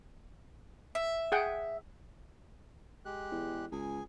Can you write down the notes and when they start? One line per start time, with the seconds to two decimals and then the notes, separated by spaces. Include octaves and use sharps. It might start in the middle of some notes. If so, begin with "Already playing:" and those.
0.95 E5
1.32 G#4 F#5 G5
3.05 G#3 G4 F#6
3.32 E2
3.72 C#2 G#4 G#5